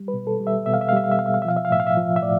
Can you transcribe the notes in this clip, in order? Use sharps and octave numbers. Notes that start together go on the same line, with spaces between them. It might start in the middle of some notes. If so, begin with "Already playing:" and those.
Already playing: G3
B4
B2
A4
G3
E5
B2 E5
F5
E5
F5
G3 E5
F5
E5
B2 F5
E5
F5
E5
F3 F5
E5
F5
A2 E5
F5
E5
F3
E5
A2 D5